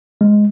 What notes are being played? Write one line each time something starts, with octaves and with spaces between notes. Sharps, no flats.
G#3